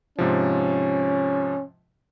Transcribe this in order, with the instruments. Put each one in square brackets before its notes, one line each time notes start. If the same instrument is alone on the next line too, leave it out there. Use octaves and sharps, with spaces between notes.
[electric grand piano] G#2 C3 F3 [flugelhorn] C#4